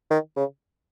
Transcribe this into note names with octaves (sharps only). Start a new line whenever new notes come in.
D#3
C#3